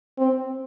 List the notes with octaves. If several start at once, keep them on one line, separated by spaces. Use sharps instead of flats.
C4